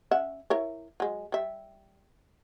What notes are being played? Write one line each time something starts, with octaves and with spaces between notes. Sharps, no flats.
C#4 E5 F#5
E4 A#4 C#5
F#3 G#3
G3 E5